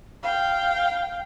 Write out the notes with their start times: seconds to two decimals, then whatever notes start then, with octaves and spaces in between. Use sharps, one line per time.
0.23 F5 G5